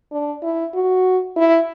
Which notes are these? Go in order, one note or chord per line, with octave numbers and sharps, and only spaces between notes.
D4
E4
F#4
E4